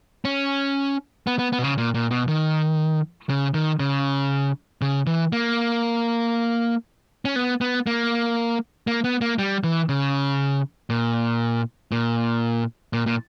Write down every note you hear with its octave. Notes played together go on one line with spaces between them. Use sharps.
C#4
B3
B3
B3
B2
C#3
A#2
A#2
B2
D#3
C#3
D#3
C#3
C#3
E3
A#3
C#4
B3
B3
A#3
A#3
B3
A#3
G3
E3
C#3
A#2
A#2
A#2
A#2